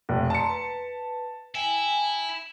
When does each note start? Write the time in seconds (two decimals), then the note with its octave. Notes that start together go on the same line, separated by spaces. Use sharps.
0.09 F1
0.30 A5 A#5 C6 C#7
0.49 B4
1.55 E4 G5 G#5